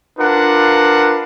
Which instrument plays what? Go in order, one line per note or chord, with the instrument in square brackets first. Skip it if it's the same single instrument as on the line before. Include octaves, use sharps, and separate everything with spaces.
[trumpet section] D4 F4 A#4 B4 F#5